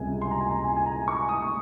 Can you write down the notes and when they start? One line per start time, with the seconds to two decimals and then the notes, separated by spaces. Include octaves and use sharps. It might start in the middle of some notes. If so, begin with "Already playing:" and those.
Already playing: C#2 C3 G3 G#5
0.22 C6
0.31 A#5
0.40 G#5
0.51 A#5
0.64 G#5
0.76 G#5
0.86 A#5
1.08 C#6
1.29 D#6
1.42 D#6